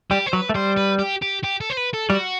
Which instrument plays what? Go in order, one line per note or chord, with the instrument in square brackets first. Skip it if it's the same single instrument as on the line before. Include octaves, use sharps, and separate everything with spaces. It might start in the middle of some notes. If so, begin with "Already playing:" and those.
[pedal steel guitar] G3 [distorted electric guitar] G4
[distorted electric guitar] C5
[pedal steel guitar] F#3 [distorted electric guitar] B4
[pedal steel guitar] A3
[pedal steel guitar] G3 [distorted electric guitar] C5
[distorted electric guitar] B4
G4
G4
G4
A4
C5
B4
A4
[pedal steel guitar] G3 [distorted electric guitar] F#4